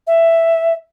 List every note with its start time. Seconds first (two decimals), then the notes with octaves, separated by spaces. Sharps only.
0.07 E5